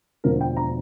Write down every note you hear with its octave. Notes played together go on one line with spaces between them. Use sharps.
E1 D2 D3 F3 A#4
G5
A#5